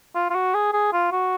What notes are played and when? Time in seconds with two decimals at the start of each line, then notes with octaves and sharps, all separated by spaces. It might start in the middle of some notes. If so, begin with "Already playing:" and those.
0.15 F4
0.30 F4
0.35 F#4
0.54 G#4
0.73 G#4
0.93 F4
1.12 F#4